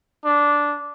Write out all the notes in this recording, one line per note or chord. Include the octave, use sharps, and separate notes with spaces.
D4